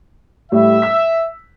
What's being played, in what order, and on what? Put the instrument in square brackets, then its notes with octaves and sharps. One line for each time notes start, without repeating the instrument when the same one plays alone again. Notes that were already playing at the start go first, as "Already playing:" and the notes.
[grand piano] A2 G3 [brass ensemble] E5
[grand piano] E6 B6